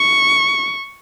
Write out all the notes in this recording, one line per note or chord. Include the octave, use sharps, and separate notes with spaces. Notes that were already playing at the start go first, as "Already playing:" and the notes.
Already playing: C#6